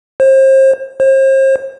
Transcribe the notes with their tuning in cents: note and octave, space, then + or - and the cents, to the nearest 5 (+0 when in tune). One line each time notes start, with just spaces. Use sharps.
C5 +35
C5 +40